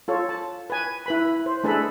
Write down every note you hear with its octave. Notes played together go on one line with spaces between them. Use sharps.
F4 A4 C#5
A5
B4 G#5
E4 B4 B5
C5
A3 D4 G#4 A4 B4 B5